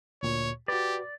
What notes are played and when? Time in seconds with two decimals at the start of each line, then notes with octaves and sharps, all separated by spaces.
0.23 D2 A#2 C#5
0.68 F#4 G4 B4 D5